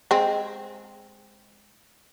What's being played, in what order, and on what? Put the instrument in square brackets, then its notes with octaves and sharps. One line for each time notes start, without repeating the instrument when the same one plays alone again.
[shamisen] G#3 C4